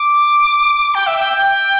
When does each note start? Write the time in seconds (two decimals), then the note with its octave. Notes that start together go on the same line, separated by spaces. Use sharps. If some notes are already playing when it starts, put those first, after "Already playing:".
Already playing: D6
0.95 G5
1.07 E5
1.20 G5
1.33 G5